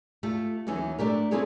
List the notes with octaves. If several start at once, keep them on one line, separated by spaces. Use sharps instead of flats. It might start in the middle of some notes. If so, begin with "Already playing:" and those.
A3 F4 G4 A4
D#2 E3 F#3 C#4 E5
A3 D4 G4 A#4
C4 E4 F4 G#4 A4 C#5